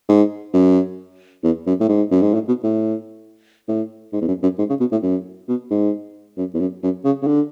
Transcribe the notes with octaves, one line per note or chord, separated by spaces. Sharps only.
G#2
F#2
E2
F#2
A2
G#2
F#2
G#2
A2
B2
A2
A2
G#2
E2
F#2
F#2
G#2
C#3
B2
A2
F#2
B2
G#2
F#2
E2
F#2
F#2
C#3
C#3
D3